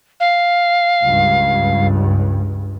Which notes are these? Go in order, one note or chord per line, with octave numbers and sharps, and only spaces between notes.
F5
C#2 G2